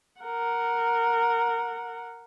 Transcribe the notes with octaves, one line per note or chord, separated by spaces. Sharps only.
A#4 F#5